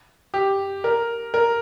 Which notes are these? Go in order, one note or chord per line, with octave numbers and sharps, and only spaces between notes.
G4
A#4
A#4